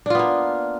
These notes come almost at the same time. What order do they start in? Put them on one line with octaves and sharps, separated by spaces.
D4 F4 B3 A#3